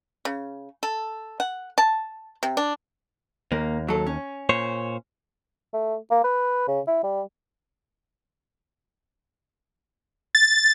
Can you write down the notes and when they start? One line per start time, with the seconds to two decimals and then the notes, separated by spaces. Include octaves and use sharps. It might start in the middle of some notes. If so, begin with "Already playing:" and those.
0.25 C#3
0.83 A4
1.40 F#5
1.78 A5
2.43 C3
2.57 D4
3.52 D#2 A#3
3.88 F#3 A4
4.07 C#4
4.49 A#2 C5 C#5
5.73 A3
6.11 A#3
6.24 B4
6.68 C#3
6.87 E4
7.03 G3
10.35 A6